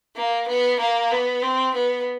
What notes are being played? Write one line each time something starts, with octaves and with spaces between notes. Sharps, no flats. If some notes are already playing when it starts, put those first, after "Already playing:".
A#3
B3
A#3
B3
C4
B3